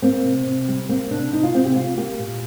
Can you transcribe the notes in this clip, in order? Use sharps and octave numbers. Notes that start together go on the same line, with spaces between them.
A#3 C4
C3
C3
G3
A#3 C4
C3 D4
C3 D#4
F4
C3 C4
G4
G3 F4
A#3 G4
A#2